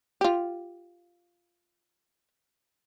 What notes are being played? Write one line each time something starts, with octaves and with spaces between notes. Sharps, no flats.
F4 G4